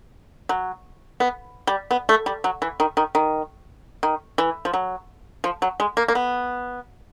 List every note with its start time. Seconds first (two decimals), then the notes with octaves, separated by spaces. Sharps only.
0.49 F#3
1.20 B3
1.67 G3
1.91 B3
2.09 A3
2.26 G3
2.44 F#3
2.62 E3
2.80 D#3
2.97 D#3
3.15 D#3
4.03 D#3
4.38 E3
4.65 F3
4.73 F#3
5.44 F3
5.62 F#3
5.80 G#3
5.97 A#3
6.08 A#3
6.15 B3